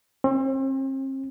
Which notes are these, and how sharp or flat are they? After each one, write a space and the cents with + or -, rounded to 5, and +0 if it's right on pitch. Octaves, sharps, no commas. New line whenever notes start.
C4 +40